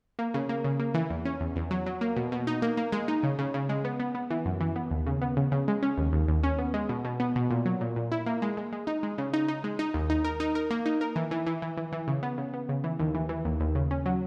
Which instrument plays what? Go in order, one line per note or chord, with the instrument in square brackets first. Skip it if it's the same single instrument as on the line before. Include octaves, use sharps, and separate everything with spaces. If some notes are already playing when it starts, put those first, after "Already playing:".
[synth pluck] A#3
C#3
A#3
C#3
A#3
E3
E2
C#4
E2
E2
F#3
F#3
A#3
B2
B2
D#4
A#3
A#3
G#3
D#4
C#3
C#3
C#3
G#3
B3
B3
B3
E3
F#2
E3
B3
D#2
C#3
B3
C#3
C#3
G#3
C#4
D#2
D#2
D#2
C#4
B3
G#3
B2
B2
B3
B2
A#2
F#3
A#2
A#2
E4
A#3
G#3
G#3
G#3
D#4
G#3
C#3
D#4
D#4
G#3
D#4
D#2
D#4
A#4
D#4
A#4
A#3
D#4
A#4
E3
E3
E3
E3
E3
E3
C#3
B3
C#3
B3
C#3
E3
D#2
E3
E3
D#2
D#2
C#3
C#4
F#3